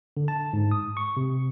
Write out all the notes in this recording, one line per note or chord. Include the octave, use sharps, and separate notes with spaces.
D3
A5
G#2
D#6
C#6
C3